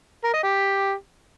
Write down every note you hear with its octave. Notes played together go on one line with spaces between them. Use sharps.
A#4
D#5
G4